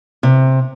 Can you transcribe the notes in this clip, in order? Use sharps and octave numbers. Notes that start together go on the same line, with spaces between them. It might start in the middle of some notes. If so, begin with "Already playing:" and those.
C3